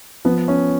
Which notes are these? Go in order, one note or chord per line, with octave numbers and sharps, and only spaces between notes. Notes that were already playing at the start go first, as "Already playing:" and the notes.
F3 B3
C#4